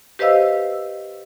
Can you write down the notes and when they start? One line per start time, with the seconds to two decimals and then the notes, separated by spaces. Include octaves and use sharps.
0.19 G4 B4 C5 D#5 F5 E6